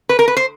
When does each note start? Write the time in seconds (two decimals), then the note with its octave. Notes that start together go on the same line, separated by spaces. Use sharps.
0.09 B4
0.19 A#4
0.28 B4
0.37 C5